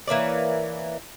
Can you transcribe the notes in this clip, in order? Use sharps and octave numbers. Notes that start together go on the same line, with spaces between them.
E3 A#3 C#5 D5